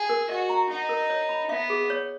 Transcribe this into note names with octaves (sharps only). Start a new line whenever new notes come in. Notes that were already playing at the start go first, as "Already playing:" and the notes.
Already playing: G#4
A#4
F#4 D#5
A#5
D#4 F#5
A#4
C#5
B5
B3 E5
G#4
C#5